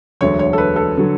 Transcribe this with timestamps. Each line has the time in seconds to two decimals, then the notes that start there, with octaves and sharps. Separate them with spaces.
0.21 E1 D2 D3 F#3 C#5
0.39 C#5
0.53 A4
0.58 B4
0.76 A4
0.97 D3 F#3